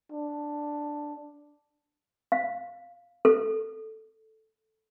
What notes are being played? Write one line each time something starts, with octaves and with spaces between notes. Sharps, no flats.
D4
F5
A4